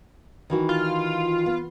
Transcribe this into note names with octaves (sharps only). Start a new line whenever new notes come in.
D#3 E3 F#4
F4
B3